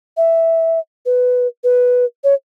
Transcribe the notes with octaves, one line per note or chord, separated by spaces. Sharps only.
E5
B4
B4
C#5